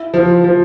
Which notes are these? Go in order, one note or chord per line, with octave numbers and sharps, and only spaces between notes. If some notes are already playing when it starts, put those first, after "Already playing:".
Already playing: E4
F3
F3